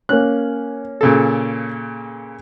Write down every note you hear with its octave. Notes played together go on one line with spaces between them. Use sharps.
A#3 C#4 F#6
A#2 C#3 A4